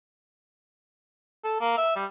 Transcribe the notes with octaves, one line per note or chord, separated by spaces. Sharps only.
A4
A#3
E5
G3